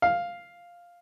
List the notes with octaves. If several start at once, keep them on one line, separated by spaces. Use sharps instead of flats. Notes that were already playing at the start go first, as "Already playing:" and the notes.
F5